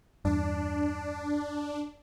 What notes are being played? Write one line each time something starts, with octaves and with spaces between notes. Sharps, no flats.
E2 G2 D4